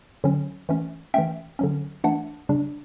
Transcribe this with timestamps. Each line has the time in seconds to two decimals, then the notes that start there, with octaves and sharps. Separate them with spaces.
0.24 D3 F#3 C#4
0.69 E3 A3 C#4
1.14 E3 A3 C#4 E5 G5
1.59 D3 F#3 C#4
2.04 E3 A3 D4 F#5 A5
2.49 C#3 G3 D4